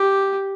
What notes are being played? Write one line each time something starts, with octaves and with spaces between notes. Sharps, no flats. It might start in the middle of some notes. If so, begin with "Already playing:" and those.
Already playing: G4